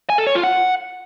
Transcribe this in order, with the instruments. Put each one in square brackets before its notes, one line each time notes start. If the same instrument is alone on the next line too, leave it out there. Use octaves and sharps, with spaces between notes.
[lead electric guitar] G#5
A4
C#5
F4
F#5